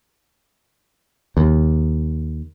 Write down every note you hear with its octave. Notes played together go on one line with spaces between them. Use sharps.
D#2